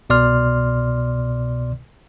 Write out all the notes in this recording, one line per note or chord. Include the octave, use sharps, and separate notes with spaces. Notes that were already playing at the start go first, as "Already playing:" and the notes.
C2 B2 D5 C6 F6